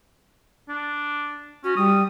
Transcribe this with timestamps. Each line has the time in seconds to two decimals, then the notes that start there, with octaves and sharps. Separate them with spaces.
0.69 D4
1.64 C#4 F#4
1.77 G3 D#6